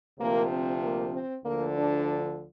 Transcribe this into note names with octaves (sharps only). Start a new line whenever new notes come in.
D2 C3 F3 A#3
C4
A#3
C4
D2 D3 F3 A#3
D4